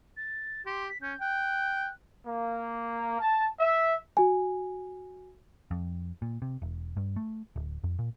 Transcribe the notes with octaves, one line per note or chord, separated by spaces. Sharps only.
A6
G4 C6
B6
C#4 G6
G5 F#6
A#3
A5
E5
F#4 G#5
F2
A#2
C3
E1
G2
A3
D1
F2
A#2